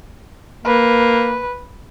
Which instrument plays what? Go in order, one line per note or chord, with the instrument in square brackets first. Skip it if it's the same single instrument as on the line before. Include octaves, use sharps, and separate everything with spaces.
[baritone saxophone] A#3 [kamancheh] B4